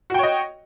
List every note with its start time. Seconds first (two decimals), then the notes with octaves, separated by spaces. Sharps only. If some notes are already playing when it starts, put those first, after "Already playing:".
0.10 F#4
0.14 G5
0.19 C#5
0.23 D#5